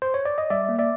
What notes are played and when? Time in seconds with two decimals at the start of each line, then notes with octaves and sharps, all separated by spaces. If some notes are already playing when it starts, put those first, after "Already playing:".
0.02 C5
0.14 C#5
0.25 D5
0.38 D#5
0.50 G3 D5 E5
0.69 A#3
0.79 D5 E5